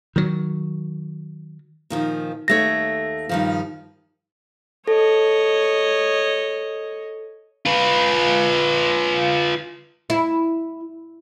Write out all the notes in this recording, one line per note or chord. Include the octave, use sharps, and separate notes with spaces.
D#3 F#3
A#2 D#3 F3
D#2 A3 C#5 A#6
G2 D#3 F3
A4 C#5 D#5
F4 B4
E4